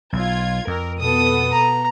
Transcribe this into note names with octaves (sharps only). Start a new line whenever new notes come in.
B1 F4 G#6
F2 A#4
B2 B3 A4 D#6
A#5